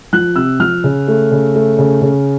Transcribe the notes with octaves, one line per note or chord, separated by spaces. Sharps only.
F3 F#6
C3 E6
F3 F6
C#3
A3
C#3
A3
C#3
C#3